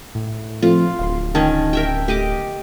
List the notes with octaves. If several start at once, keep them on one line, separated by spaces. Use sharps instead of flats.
A2
F3 A3 C4 F4
D1 F5 C6
D#3 C#4 A5
A#4 E5 G5
A3 G4 D#5 D6